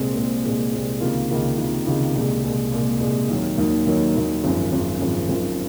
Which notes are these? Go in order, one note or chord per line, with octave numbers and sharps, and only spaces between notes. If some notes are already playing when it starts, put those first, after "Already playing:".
Already playing: C2 A#2 G#3 C4
C2 A#2 G#3 C4
C2 A#2 G#3 C4
C2 A#2 G#3 C4
C#2 C3 D#3 A#3 F4
C#2 C3 D#3 A#3 F4
C#2 C3 D#3 A#3 F4
C#2 C3 D#3 A#3 F4
C2 A#2 G#3
C2 A#2 G#3
C2 A#2 G#3
C2 A#2 G#3
D#2 D#3 F#3
D#2 D#3 F#3
D#2 D#3 F#3
D#2 D#3 F#3
G#1 F#2 F3
G#1 F#2 F3
G#1 F#2 F3
G#1 F#2 F3